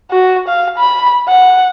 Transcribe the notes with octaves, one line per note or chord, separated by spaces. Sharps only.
F#4
F5
B5
F#5